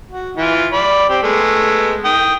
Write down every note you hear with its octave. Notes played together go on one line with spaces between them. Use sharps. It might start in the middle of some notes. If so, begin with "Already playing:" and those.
F#4
E3 E4 F4
D5 B5
C4 G4
G#3 A3 B3
G5 D#6